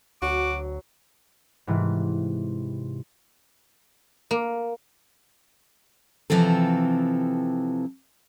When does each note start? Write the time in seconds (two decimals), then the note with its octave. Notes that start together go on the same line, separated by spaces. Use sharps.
0.22 D2 F#3 F#4 D6
1.67 G#2 C3 E3
4.31 A#3
6.30 C3 E3 F3 C4 A4